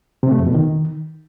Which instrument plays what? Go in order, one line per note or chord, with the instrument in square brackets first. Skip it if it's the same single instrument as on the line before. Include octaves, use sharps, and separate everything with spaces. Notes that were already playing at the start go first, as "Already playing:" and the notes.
[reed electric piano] C3
A3
F2
B2
D#3